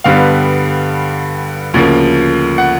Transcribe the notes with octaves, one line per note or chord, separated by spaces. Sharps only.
G2 D3 G3 B3 F5
D2 C#3 F3 A#3
F#5